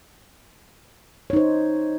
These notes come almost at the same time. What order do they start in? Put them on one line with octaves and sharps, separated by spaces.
C#5 D#4 C5